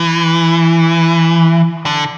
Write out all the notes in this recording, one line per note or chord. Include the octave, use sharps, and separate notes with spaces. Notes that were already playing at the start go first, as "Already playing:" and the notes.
Already playing: E3
D3